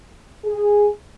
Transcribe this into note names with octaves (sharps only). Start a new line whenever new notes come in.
G#4